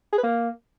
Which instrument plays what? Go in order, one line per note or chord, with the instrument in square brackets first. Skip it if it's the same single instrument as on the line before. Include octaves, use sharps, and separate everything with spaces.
[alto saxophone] G#4
B4
A#3